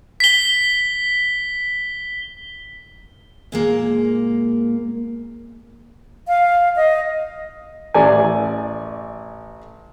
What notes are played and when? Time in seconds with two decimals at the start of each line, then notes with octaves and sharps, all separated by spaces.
0.20 B6 G7
3.52 A#2 G#3 A#3
6.28 F5
6.76 D#5
7.94 A1 D5 G#5